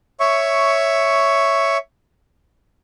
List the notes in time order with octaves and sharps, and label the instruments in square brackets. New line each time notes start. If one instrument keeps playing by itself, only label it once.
[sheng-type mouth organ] C#5 E5 C#6